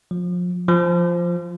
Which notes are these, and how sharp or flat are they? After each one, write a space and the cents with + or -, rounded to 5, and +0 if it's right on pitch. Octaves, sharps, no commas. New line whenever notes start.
F3 +30
F3 -5